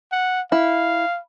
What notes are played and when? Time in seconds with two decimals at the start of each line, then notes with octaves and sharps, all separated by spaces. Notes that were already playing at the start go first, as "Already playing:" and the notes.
0.12 F#5
0.52 E4 F5